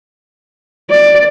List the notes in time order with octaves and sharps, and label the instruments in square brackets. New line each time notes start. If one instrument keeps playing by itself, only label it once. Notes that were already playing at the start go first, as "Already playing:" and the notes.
[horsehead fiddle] D5